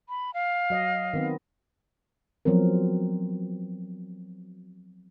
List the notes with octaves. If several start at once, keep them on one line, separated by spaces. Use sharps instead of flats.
B5
F5
F#3 D#5
D#3 B3 C4
F3 F#3 B3 C4 A#4